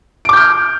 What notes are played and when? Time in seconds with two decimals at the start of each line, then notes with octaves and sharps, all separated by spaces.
0.25 D7
0.29 D6
0.33 G6
0.37 F6